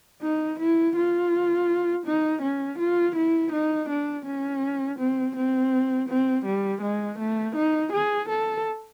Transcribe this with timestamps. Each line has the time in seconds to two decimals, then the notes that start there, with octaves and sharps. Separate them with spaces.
0.22 D#4
0.59 E4
0.96 F4
2.06 D#4
2.42 C#4
2.79 F4
3.16 E4
3.52 D#4
3.89 D4
4.25 C#4
4.99 C4
5.36 C4
6.09 C4
6.45 G3
6.82 G#3
7.19 A3
7.56 D#4
7.92 G#4
8.29 A4